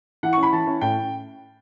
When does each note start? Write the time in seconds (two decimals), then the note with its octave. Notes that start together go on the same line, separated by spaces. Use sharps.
0.23 E3 F#5
0.33 C#4 C#6
0.43 B5
0.53 E3 A5
0.67 C#4
0.81 A2 G5